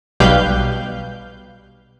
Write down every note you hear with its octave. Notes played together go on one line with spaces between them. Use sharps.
B1 B2 G3 B4 F5 G6